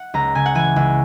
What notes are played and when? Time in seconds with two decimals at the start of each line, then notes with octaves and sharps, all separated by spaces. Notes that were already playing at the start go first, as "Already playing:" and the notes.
Already playing: F#5
0.14 C#2 A#5
0.35 C#3 G#5
0.46 F#5
0.55 E3 G#5
0.76 C#2